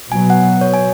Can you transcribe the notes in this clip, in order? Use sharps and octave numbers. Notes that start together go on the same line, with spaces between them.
B2 F#3 B3 G#5
F#5
C#5
G#5